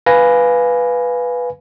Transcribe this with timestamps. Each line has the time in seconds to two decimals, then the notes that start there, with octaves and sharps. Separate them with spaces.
0.06 B4 F5 G#5 A#6